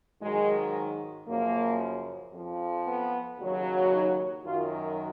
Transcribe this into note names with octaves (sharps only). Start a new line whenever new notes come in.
G#2 D#3 F#3 G#3
F#2 C#3 F3 A#3
F2 F3
B3
D#2 C#3 F#3
D#4
F#2 D#3 F#3 F4